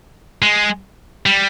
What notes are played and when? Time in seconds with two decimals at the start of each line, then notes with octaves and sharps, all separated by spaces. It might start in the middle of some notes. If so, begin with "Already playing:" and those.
0.42 G#3
1.26 G3